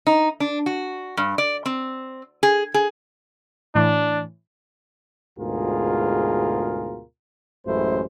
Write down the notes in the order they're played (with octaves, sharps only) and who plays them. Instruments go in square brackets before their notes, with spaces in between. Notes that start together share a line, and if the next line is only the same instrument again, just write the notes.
[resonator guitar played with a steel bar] D#4
D4
F#4
G2
D5
C4
G#4
G#4
[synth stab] A2 E3 [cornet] D4
[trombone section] D2 G#2 B2 F4 G#4 A#4
A1 F#2 G#3 A3 E4 C5